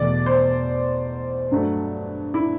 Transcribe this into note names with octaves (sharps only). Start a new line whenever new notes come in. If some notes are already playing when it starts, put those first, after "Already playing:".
Already playing: E2 B2 A3 D5
C5
G2 F#3 A3
E4